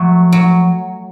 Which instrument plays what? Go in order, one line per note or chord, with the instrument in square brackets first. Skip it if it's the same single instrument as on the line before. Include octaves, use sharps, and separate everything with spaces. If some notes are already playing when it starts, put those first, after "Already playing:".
Already playing: [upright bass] F3 [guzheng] F#3 A3
[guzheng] F#3